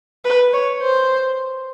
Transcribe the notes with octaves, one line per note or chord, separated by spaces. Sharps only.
B4
C#5
C5